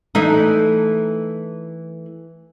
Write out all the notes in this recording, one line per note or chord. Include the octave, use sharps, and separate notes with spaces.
E3 A3 D#4